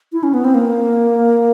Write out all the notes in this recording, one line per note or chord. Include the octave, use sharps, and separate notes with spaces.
E4
C#4
B3
C4
A#3